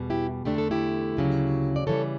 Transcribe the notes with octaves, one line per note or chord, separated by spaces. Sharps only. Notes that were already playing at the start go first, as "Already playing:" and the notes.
Already playing: E2 B2 G3
E4 G4
E2 D3 A3 D4 G4
A4
E4 G4
D2 C#3 F#3
D5
C#3 E3 G3 A4 C#5